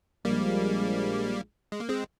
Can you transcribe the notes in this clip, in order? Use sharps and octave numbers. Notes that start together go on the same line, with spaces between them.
A#1 A#2 F3 G3 G#3 A#3
G#3
A#3
G#3 C4